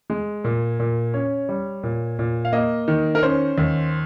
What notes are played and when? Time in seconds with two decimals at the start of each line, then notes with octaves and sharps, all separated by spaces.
0.10 G#3
0.44 A#2
0.80 A#2
1.14 C#4 C#5
1.49 G3
1.83 A#2
2.19 A#2
2.45 F5
2.53 A#3 D#5
2.88 D#3
3.15 A#4
3.22 C#4 C5
3.58 D#2